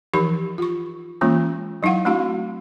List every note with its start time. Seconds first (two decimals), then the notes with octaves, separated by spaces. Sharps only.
0.13 E3 F3 D#4 G4 A#4 B5
0.58 F4 C#6
1.21 E3 G#3 A#3 C#4 F4
1.83 F#3 D#4 E4 F5 F#5
2.05 A3 C4 D4 E4 F#4 F5